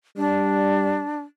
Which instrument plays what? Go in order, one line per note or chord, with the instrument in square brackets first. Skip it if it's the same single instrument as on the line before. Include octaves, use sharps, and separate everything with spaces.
[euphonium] G3 [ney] D4